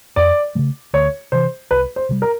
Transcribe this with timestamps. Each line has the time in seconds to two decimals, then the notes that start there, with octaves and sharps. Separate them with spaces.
0.16 F2 D5
0.55 E3 A3
0.59 C#3
0.94 D2 C#5
1.32 C3 E3 C5
1.71 C2 B4
1.96 C5
2.09 C3 D#3 G3
2.22 A#4